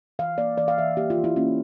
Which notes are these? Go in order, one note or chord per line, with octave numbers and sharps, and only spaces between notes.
E3 F5
A#3 D5
E3 D5
F5
E3 E5
A#3 G4
F4
E3
E4
A#3 C#4